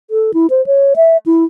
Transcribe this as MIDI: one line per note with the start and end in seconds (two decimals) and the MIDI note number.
0.11 0.32 69
0.34 0.47 64
0.50 0.65 72
0.66 0.94 73
0.96 1.17 76
1.26 1.44 64